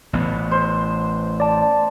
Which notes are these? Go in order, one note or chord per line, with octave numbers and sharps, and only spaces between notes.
A1 B3
C5
D5 A5